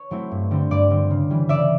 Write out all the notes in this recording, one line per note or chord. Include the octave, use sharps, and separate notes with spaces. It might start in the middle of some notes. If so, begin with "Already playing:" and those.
Already playing: C#5
F#3 A3 C4 E4
G2
D3 G3 C4
G2 D5
D3 G3 C4
C#3
E3 G3
C#3 D5 E5